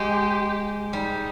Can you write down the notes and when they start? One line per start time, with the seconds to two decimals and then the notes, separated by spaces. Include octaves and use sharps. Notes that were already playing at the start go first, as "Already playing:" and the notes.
Already playing: G#3 G4
0.92 G3 D#4